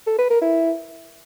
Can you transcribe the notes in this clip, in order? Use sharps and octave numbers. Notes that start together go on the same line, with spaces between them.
A4
B4
A#4
E4